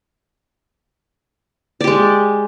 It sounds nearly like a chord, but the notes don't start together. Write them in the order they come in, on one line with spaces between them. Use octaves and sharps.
D5 G4 G#3